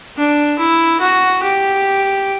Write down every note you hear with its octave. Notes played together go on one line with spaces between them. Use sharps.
D4
E4
F#4
G4